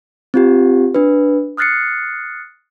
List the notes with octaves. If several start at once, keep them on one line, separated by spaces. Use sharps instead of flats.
C4 F4 G4
D4 B4
D#6 F6 F#6 A6 C7 C#7